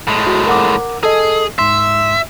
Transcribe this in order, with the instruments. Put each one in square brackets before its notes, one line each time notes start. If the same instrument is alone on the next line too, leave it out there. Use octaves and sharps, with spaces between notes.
[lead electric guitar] A2 G#3
[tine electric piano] F#4
A#4 F#5 D6
[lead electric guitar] G#4 [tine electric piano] A4 D#5
[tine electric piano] G#2 C6 [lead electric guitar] E5